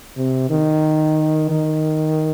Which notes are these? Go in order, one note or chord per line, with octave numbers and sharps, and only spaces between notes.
C3
D#3
D#3